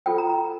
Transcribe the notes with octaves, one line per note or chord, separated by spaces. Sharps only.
F4 A4 C5 G5
A#5
A#5